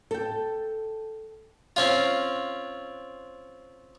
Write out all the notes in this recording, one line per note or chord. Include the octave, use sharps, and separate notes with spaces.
A4 G5
C4 C#4 F4